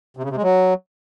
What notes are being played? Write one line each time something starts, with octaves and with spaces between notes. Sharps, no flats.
C3
C#3
C3
G#3
F#3